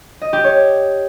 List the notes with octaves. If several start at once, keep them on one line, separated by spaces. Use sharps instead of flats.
D#5
G4
C#5